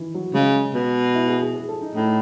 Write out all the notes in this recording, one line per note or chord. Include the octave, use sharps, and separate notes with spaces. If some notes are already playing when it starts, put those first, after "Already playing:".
Already playing: D#3 E3
F#3
C#3 G#3
B2
E4
G#4
G#4
G#4
A4
D#4
A2 D#4